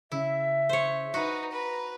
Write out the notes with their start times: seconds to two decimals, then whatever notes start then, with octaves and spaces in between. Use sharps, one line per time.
0.12 C#3 E4 E5
0.69 C5 C#5
1.14 D#4 F#4 B4 A#5
1.51 B4